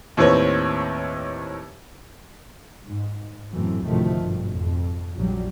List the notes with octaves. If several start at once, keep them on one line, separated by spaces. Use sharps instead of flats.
D#2 A2 C4 B4 C#5
G#2
F#2 A2 E3 A3 C4
D2 A2 C3 D#3 F3 A3
G#1 G2 B2
F2
A#1 F#3 G3